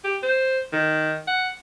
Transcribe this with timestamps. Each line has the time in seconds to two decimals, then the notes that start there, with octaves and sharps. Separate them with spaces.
0.04 G4
0.23 C5
0.73 D#3
1.27 F#5